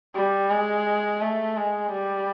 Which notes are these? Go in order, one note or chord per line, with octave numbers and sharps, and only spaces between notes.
G3
G#3
A3
G#3
G3